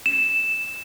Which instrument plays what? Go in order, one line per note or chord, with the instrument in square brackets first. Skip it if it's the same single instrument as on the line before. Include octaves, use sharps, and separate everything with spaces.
[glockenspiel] E7